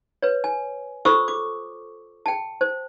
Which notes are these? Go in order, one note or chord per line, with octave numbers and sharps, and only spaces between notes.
B4 C#5
G#5
F4 A4 C5 C#6 D#6 E6
D6
G5 A5
C5